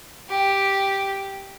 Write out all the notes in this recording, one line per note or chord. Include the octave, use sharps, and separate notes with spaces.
G4